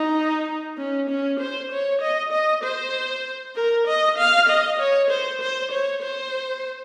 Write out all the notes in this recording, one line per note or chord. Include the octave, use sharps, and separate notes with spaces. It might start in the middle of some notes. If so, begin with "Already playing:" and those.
Already playing: D#4
C#4
C#4
C5
C#5
D#5
D#5
C5
A#4
D#5
F5
D#5
C#5
C5
C5
C#5
C5